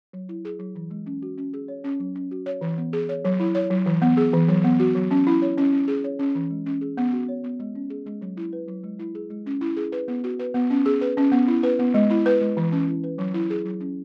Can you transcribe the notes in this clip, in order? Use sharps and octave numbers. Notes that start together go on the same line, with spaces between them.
F#3
E4
G#4
F#3
E3
G#3
C#4
F#4
C#4
G#4
C#5
C#4
F#3
C#4
F#4
C#5
E3
B3
G#4
C#5
F#3
E4
C#5
F#3
E3
B3
G#4
E3
F#3
B3
F#4
F#3
C#4
E4
C#5
C#4
C#4
G#4
C#5
C#4
E3
G#3
C#4
G#4
B3
F#4
C#5
B3
G#3
C#4
G#4
G#3
F#3
E4
B4
F#3
G#3
E4
G#4
G#3
C#4
E4
G#4
B4
B3
F#4
B4
B3
C#4
G#4
B4
C#4
B3
E4
B4
B3
G#3
E4
B4
G#3
E3
C#4
E4
B4
F#3
E4
G#4
F#3
C#4